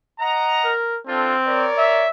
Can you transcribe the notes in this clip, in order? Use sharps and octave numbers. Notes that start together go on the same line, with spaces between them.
D#5 F#5 A#5
A#4
C4 D4 F4 A4
A#4 C#5 D5
E5